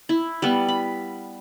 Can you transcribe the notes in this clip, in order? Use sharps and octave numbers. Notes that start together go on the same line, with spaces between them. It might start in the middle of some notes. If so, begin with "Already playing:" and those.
E4
G3 B3
B5